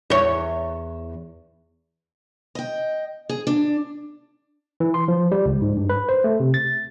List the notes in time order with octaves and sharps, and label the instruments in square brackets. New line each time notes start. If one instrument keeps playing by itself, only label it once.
[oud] E2 C#5
[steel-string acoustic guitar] D#5 G5
G#4
D4
[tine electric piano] E3
C6
F3
G3
C#2
G#2
G2
B4
C5
A3
C3
A6